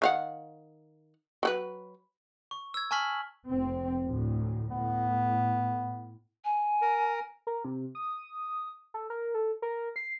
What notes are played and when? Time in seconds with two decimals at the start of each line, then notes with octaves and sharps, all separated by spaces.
0.02 D#3 F5 F#5
1.43 F#3 F#4 B4
2.51 C#6
2.74 E6 G#6
2.91 G#5 A5 C#6 F6 B6 F#7
3.49 F1 C4
4.05 D2 A2
4.71 A2 B3
6.44 G#5
6.82 A#4
7.47 A#4
7.65 C3
7.95 D#6
8.94 A4
9.10 A#4
9.34 A4
9.62 A#4
9.96 C7